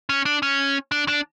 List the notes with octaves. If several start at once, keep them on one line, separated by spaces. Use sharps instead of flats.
C#4
D4
C#4
D4
D4